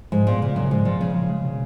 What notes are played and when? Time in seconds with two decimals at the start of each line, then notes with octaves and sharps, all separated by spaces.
0.12 G#2 F3
0.27 A#2 B3
0.42 A#2 C#3
0.56 F#2 C#3
0.71 G#2 F3
0.85 A#2 F3
1.00 C#3 F3
1.14 F3
1.29 G#3
1.44 B2